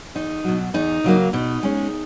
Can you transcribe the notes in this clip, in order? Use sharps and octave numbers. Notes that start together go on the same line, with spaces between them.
E2 D#4
B2 F#3
E2 D#4
C#3 F#3 A#3
B2 D#4
G#3 C#4